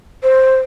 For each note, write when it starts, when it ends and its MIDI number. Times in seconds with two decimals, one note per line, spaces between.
0.23 0.57 72